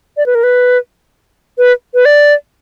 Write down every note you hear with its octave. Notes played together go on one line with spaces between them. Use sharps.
D5
B4
A#4
B4
B4
B4
D5